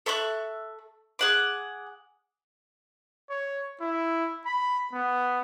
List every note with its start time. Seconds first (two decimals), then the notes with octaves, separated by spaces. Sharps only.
0.06 A4 E5 C#6 F#6
1.19 G#4 F#5 D6
3.30 C#5
3.81 E4
4.46 B5
4.93 B3